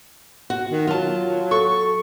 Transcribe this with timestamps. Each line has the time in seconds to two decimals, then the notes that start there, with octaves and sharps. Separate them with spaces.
0.50 F#4
0.70 D#3
0.87 F#3 F4 A5
1.51 A4 C#6